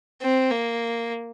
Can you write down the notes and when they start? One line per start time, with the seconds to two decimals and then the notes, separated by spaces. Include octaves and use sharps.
0.22 C4
0.51 A#3